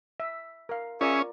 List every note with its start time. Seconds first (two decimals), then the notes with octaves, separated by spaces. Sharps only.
0.20 E5
0.69 A#4 F5
1.01 C#4 F4 G#4 A#4 C#5 D5 E5